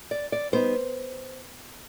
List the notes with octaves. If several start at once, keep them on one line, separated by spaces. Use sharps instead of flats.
D5
D5
G3 B3 D#4 C5